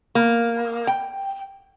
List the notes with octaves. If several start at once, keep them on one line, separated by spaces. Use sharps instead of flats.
A#3
G5